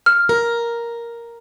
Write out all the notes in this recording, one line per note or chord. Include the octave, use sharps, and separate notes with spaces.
F6
A#4